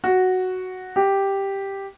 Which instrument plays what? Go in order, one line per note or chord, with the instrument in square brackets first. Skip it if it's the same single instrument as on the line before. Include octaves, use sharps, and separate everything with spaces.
[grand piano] F#4
G4